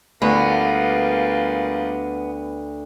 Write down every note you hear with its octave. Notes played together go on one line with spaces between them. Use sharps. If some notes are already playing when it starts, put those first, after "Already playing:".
D2 G3 A#3 B3 F4